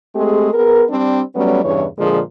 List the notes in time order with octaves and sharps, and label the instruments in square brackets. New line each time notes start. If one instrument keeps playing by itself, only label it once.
[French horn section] G#3 A3 C4 G4 G#4
B3 G#4 A#4
G3 C4 D4
F#3 G3 A3 B3 C#4
E2 G2 C#3 E3 C#5
A#2 D3 F3 G#3 G#4